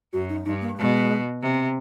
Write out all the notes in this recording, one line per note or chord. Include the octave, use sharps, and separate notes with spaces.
F#2 F#4
D#4
G2 D#4
A#3
B2 G#3
C3